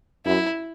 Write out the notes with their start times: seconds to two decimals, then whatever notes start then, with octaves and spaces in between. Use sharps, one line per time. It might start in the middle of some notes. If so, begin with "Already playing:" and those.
0.26 F#2 E4